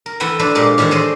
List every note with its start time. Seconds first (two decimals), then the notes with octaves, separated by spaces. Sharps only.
0.06 A#4
0.20 E3 A3 E4 B4 F#5 G5
0.39 D4 E4 A4 B4 C5
0.55 A#2 G#3 G4 A#4
0.78 A2 D#3 E3 C5 C#5
0.91 G#4 A4 C5 D5 D#5